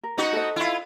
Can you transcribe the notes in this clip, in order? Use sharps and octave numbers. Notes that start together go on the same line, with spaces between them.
A#4
B3 D#4 F#4
A4 C5 D#5
E4 F4